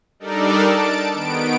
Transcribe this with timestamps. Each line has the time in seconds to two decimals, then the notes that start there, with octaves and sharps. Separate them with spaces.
0.20 G3 D4 D#4 A4 A#4 D5
0.66 A5 D7
1.14 D#3 B3 D7